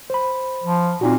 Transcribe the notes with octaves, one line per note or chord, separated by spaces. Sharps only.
C5 B5
F3
A#2 C4 D#4 F#4